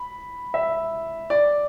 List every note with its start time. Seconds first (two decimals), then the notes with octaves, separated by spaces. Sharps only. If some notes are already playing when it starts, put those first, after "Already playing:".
Already playing: B5
0.54 E5
1.30 D5